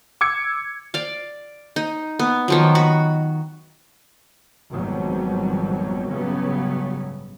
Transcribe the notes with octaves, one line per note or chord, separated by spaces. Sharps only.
D6 E6 G#6 C#7
D5 F5
D#4
B3
D#3 F3 F#3
F#4 B5
G#1 F2 B2 F#3 G3
A1 G2 C#3 F#3 B3 C#4